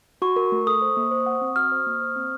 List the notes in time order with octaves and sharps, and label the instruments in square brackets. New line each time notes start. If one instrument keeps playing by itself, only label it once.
[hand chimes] F#4 [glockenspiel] C#6
[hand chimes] A#4
A3
[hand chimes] A4 [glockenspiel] D#6
[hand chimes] C5
A#3
C5
F#5
C4
[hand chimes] F#4 [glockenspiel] F6
[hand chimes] C5
A#3
C5
C4